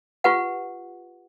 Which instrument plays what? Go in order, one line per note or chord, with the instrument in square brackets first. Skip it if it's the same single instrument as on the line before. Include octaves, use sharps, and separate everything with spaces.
[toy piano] F4 G4 B4 F#5